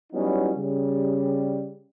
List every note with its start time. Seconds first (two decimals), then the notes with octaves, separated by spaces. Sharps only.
0.13 F#3 G3 B3 C#4 D#4 E4
0.56 C#3 G3